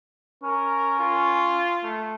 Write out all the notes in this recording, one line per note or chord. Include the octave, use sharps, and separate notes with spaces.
C#4 A#4
F4
A3